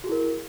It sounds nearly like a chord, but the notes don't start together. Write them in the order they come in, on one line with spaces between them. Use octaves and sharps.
F#4 G#4 E4 A#4